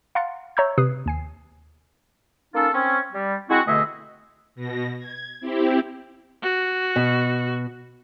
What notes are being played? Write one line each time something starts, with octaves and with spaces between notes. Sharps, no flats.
F5 F#5 A#5 C6 A6 C#7
C#5 E5 A#5 C#6 E6 G6
C3 B4 D#6 F#6 C7
D#2 G#5 C7
A#3 C#4 D#4 F4 A4
C4 C#4
G3
G#3 C4 E4 F#4
B2 D3 A3 G#4 D#5 E5
B2 A#6
G#6
C4 E4 G4
F#4
B2